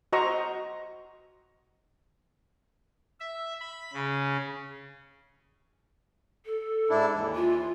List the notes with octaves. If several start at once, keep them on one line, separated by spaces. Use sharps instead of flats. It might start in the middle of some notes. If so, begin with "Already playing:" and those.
F#4 C5 D#5 A#5 C#6
E5
B5
C#3
A4
G#2 D4 E4
D#2 E3
F4